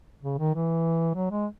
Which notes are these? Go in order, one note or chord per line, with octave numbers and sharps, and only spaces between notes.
C#3
D#3
E3
F#3
G#3